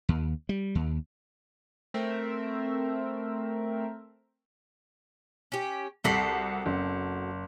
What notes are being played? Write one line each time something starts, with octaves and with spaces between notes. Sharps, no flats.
D#2
G3
D#2
A3 C4 A#4 E5
C#4 G4
C2 C4 F#4 A4 B6 C7
F#1